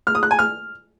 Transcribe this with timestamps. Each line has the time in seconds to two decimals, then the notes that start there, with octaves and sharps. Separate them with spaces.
0.07 F6
0.15 D#6
0.23 F#6
0.31 G#5
0.39 F6